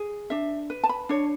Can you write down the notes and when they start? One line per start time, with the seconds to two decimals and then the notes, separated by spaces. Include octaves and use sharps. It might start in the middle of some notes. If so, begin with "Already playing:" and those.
Already playing: G#4
0.30 D4 E5
0.70 B4
0.83 A5
0.89 B5
1.09 D4 C#5